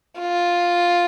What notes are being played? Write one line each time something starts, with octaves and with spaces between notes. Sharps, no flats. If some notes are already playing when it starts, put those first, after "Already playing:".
F4